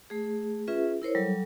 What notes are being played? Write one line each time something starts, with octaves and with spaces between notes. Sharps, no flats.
A3 G#4
C#4 F4 G#4 B4 E5
E4 A#4 C5 C#5
F#3 G3 A4